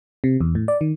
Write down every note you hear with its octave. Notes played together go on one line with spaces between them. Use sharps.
C3
E2
A2
D5
D#3